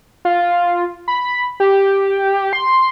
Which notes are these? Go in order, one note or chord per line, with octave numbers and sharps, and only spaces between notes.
F4
B5
G4
C6